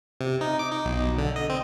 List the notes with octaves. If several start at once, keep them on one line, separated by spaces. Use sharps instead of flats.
C3
D#4
D6
D#4
B1
D3
D#5
C4